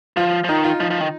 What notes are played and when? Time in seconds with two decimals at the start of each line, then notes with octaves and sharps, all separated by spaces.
0.17 F3 F4
0.44 F3
0.49 D#3 D#4
0.64 F4
0.80 F3 D#4
0.90 F3
1.01 D#3